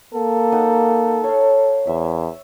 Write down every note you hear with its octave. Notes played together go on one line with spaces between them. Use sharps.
A#3 A4
D#4 F#5 D#6
C#5 F5
E2 E5